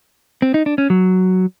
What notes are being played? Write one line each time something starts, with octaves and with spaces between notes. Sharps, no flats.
C4
D#4
D4
C#4
F#3